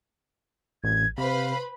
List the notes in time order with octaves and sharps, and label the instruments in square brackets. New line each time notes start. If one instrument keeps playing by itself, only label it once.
[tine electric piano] A1 [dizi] G#6
[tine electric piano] C3 [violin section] B4 C5 B5 [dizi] F5